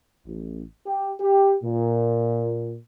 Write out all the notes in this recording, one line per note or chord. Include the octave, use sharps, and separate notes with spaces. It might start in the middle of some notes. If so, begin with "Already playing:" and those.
A1
G4
G4
A#2